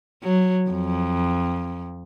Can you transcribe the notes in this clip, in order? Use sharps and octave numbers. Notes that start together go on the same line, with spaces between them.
F#3
F2